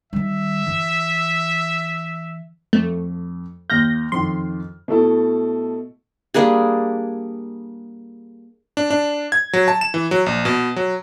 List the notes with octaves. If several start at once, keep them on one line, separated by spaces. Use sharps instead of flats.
D#3 G3 E5
E3
F2 A3
D#2 F6 G6 A#6
F2 D#3 C6
B2 A3 E4 A4
G3 A#3 D4 G#4
D4
D4
G#6
F#3
A5
E7
E3
F#3
A#1
B2
F#3